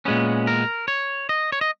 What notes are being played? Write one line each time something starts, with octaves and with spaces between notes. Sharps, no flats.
A#2 G#3 B3 C#4
A#4
C#5
D#5
C#5
D#5